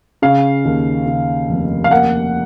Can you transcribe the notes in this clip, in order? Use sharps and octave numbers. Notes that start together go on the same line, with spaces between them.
C#3 F5
D#2
C#3
F1
F5
A#3 F#5